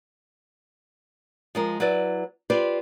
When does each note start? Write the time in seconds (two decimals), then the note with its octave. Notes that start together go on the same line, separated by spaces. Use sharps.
1.55 F3 G#3 A#4
1.80 F#3 E4 B4 D5
2.50 F4 G4 B4 C5 D5